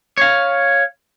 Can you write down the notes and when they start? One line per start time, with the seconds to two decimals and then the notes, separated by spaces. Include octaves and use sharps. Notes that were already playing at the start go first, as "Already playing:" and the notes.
0.18 C#5 F5